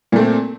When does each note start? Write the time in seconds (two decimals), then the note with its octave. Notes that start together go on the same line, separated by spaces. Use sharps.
0.12 A#2
0.16 A3
0.19 C4